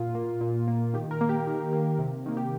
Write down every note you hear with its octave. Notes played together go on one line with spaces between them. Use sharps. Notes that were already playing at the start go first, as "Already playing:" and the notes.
Already playing: A#2 F4
A#3
A#2
A#3
D#3 G4
A#4
A#3
G4
D#3
A#3
C3
D#3 A#3
G4